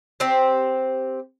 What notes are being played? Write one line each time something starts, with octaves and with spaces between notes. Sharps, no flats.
C4 G4 C5